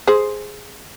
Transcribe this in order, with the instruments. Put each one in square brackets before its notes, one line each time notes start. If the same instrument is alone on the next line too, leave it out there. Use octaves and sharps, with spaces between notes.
[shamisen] G#4 C5